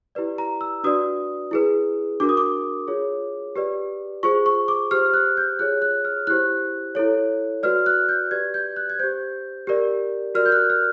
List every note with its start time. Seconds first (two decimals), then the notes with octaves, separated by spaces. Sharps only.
0.15 E4 G4 B4 D5
0.38 A#5
0.61 E6
0.83 D4 F#4 B4 D5 D#6
1.51 E4 G#4 B4
2.20 D4 F#4 A#4 D6
2.29 D#6
2.37 D6
2.88 F4 G#4 C#5
3.56 G4 B4 D5
4.23 F4 G#4 C5 C#6
4.46 C#6
4.68 D6
4.91 G4 C5 F6
5.14 F#6
5.37 G6
5.59 F4 G#4 C#5 F#6
5.82 F#6
6.05 F6
6.27 E4 G4 C5 F#6
6.95 E4 A4 C#5
7.63 F#4 B4 D5 F6
7.86 F#6
8.09 G6
8.31 G4 B4 D5 G#6
8.54 G6
8.76 F#6
8.90 G#6
8.99 G4 C5 G6
9.67 G4 A#4 D5
10.35 F#4 A#4 D5 F6
10.46 G6
10.52 F#6
10.70 F6